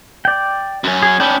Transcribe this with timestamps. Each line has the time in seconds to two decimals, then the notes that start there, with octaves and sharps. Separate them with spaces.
0.25 D5 G5
0.84 F#2 C#4
1.03 G#4
1.20 C#4 D4 G5 B5 D#6